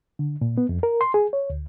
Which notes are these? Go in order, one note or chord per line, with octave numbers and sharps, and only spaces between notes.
D3
A#2
B3
F2
A#4
C6
G#4
C#5
D2